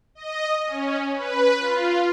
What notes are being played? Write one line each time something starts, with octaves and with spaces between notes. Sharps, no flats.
D#5
C#4
B4
F4